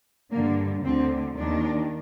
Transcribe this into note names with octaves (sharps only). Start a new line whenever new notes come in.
G2 D3 A#3
D2 D3 C4
D#2 D#3 D4